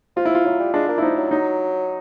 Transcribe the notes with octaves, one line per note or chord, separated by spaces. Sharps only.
F3 F4
E4
F3 F4
F#3 E4
G3
G#3 D4
A#3
E4
F3 D#4
F#3
F#3 D#4